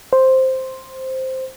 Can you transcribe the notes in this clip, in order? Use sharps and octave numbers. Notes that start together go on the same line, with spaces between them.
C5